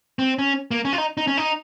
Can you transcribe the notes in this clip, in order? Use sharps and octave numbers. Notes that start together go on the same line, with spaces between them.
C4
C#4
A#3
C#4
F4
D#4
D#4
C#4
D#4